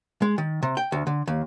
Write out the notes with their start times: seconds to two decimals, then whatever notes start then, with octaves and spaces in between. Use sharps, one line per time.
0.22 G#3
0.38 D#3
0.63 C3
0.77 G5
0.92 D2
1.07 D3
1.28 D#2